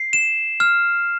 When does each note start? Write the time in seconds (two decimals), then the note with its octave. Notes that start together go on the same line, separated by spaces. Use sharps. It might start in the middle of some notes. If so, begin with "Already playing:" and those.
Already playing: C7
0.13 E7
0.60 F6